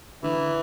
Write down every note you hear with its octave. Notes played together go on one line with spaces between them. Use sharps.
D3 E3